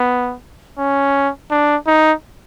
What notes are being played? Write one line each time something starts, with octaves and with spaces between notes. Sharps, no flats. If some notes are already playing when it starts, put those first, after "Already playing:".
Already playing: B3
C#4
D4
D#4